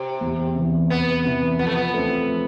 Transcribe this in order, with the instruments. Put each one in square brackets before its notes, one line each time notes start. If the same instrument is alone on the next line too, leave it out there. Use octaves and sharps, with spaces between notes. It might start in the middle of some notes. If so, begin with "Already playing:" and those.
Already playing: [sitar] C3
[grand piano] E2
C3 E3
[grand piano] E2 [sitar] B3
[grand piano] C3 E3
[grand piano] F3 [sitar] B3
[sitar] A3
B3
[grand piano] A3 C4
F3